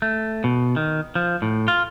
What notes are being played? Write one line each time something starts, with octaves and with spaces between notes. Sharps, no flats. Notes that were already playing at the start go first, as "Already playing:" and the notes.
A3
B2
D#3
F3
A2
F4